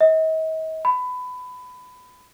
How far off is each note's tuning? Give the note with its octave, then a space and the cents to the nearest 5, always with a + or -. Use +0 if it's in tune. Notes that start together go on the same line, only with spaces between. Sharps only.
D#5 +40
B5 +20